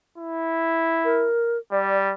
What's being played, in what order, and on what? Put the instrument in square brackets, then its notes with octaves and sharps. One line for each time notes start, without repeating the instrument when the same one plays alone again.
[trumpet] E4
[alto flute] A#4
[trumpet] G3 [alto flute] D5